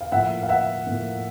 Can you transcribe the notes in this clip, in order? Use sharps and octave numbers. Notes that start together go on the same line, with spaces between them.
F5
A2 F3 A#3 E5 F#5
F5
E5 F#5
A2 F3 A#3